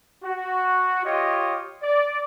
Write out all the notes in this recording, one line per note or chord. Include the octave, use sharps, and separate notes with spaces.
F#4
F4 G4 C#5 D#5
D5